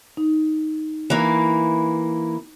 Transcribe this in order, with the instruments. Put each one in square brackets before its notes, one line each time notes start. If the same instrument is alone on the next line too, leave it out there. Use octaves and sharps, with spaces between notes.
[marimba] D#4
[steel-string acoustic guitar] E3 A#3